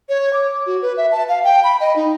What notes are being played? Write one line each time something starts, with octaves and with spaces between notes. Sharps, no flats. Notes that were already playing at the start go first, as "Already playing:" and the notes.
C#5
D6
F#4
B4
E5
A5
F5
G5
B5
D#5
D#4